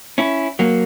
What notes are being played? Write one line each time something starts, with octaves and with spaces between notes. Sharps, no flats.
C#4 E4
F#3 A#3